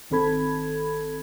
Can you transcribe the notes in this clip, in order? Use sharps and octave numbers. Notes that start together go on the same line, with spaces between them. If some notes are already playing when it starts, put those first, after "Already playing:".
G#1 D#3 C4 A4 B5 G#6